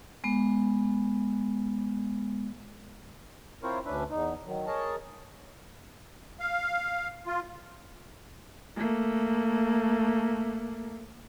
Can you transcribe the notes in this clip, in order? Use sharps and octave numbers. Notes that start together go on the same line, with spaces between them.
G#3 B3
C4 E4 F4 A#4 C5 C#5
D2 C#4 D4 B4 E5
E2 D#4
D#3 F#3
G#4 A#4 C#5 D#5 A5
F5
F4
A3 A#3